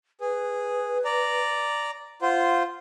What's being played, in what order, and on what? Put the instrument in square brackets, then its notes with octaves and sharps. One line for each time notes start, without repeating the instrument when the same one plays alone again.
[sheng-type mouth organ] G#4 [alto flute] B4
[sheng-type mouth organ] D5 A#5
[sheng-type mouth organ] F4 C5 [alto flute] F#5